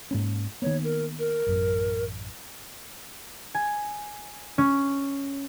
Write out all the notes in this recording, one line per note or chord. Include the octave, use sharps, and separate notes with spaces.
G#2 A#3 C#4
D#3 A#3 B3 C#5
A#4
A#4
A1 F#2
G#5
C#4